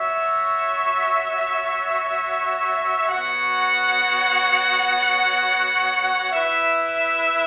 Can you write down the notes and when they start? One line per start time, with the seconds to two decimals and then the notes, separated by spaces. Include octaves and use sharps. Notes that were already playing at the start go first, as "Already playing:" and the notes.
Already playing: F#4 C#5 E5
3.10 B3 F#4 C#5 F#5
6.32 E4 B4 E5